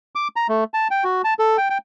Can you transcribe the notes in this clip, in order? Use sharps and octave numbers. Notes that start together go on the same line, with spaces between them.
D6
A#5
A3
A5
G5
F#4
A5
A4
G5
G5